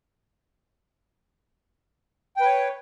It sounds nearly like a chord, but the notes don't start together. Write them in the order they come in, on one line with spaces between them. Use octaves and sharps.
G5 B4 C#5